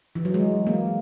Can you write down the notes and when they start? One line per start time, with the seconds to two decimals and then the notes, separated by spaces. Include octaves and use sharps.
0.15 E3
0.25 F#3
0.34 G#3
0.67 A#3